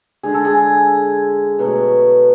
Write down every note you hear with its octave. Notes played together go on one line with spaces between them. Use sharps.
D3 G#3 G#4
A4
G#4
B2 F#3 A3